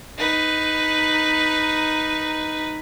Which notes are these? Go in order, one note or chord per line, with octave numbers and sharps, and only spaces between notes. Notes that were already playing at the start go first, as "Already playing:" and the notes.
D#4 B4